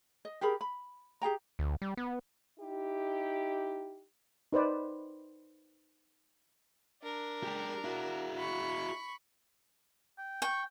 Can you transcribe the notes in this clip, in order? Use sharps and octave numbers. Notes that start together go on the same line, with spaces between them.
D#5
G4 G#4 A#4 B5
B5
G4 G#4 G5 A#5
D2
G3
B3
D#4 E4 G4
D#4 B4 C5 D5
D4 A#4
G#3 G4
E4 F#4
B5 C#6
G5
G5 C#6